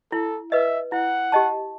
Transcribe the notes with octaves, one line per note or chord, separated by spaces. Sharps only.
E4 A4
B4 D#5 E5
E4 F#5
G4 D#5 A5